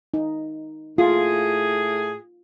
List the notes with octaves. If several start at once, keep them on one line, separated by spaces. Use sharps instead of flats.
D#4
A2 F4 G#4